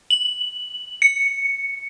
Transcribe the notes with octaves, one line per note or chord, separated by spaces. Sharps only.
F#7
C#7